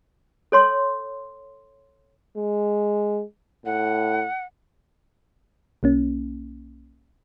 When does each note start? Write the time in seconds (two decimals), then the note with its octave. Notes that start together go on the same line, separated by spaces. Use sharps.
0.52 A4 C#5 C6
2.36 G#3
3.66 A2 F#5
5.83 B1 A#3 C#4